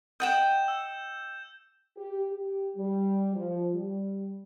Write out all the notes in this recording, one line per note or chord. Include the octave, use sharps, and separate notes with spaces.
D#5 F#5 G5 G6 E7
E6
G4
G4
G3
F3
G3